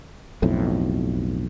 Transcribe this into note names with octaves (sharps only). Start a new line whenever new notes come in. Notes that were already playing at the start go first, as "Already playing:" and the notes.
B1 F2 A2